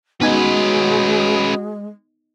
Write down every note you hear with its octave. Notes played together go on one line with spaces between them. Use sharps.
G#3 B3 C#4 D#4 F#4 B4 G#5